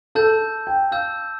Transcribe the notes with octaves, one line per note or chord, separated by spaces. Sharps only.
A4 A5 E6 G6
G5
F5 A5 E6 G6